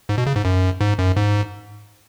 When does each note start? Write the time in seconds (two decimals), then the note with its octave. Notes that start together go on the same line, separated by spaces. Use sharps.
0.09 G#2
0.18 B2
0.26 C#3
0.36 G#2
0.45 F#2
0.81 G#2
0.99 F#2
1.16 G#2